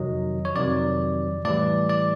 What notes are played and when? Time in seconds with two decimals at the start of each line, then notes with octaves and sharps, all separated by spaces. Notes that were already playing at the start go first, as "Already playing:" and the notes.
Already playing: F2 C3 D#3 F#3 D#5
0.45 C#5
0.56 F2 C3 D#3 F#3 D5
1.45 A2 E3 G3 D5
1.89 D5